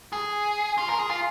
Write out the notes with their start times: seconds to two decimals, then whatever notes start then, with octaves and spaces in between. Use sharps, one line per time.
0.13 G#4
0.78 F4
0.88 A#4
0.99 G#4
1.10 F4